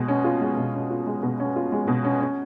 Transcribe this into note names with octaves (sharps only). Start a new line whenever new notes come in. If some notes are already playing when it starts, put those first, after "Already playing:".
Already playing: B2 G#3
C#4
F4
G#3
B2
C#4
F4
G#3
B2
C#4
F4
G#3
B2
C#4
C#4